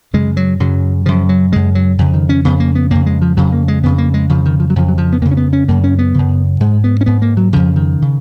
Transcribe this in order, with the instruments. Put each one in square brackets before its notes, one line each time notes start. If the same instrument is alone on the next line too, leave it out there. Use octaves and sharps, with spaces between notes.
[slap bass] F#2 C#3 G#3
F#3
F#2 C#3 F#3
F#2 C#3 F3
F#3
F#2 C#3 G#3
F#3
F2 C#3
D#3
C#4
F2 C#3 B3
A#3
B3
F2 C#3 A#3
G#3
F3
F2 C#3 F#3
A#3
G#3
F2 C#3 B3
A#3
G#3
F2 C#3 F3
D#3
F3
F#3
F2 C#3 F3
F#3
F3
B3
F2 C#3 A#3
C#4
B3
C#4
F#2 C#3 A#3
C#4
B3
F#2 C#3
G#2 G#3
B3
C#4
G#2 B3
A#3
F#3
F2 C#3 F3
D#3
C#3